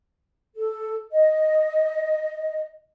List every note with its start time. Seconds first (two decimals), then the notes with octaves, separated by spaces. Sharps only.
0.56 A4
1.12 D#5